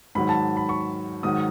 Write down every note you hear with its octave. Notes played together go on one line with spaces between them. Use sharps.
G#2 D#3 F#3 B5
A5
B5
C#6
G#2 D#3 F#3 D#6